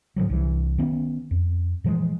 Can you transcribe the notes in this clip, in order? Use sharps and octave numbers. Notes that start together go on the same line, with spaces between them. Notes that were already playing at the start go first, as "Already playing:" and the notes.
G#2 D3 F3 F#3
C2 E3
D#3 B3 C#4
F2
A#2 E3 F3 G#3